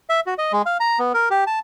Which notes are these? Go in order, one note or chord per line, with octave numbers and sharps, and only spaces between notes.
E5
F#4
D#5
G#3
F5
A#5
B3
A#4
G4
A5